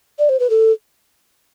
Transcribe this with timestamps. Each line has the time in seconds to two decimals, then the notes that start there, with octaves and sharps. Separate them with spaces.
0.19 D5
0.29 C5
0.40 B4
0.50 A4